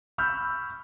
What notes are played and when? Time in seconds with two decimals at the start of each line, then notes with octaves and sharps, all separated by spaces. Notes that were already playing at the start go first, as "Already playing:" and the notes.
0.18 B5 C#6 E6 F6 G6